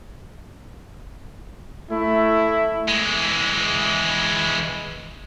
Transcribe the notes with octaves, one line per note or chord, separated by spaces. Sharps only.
A3 E4
E3 G#3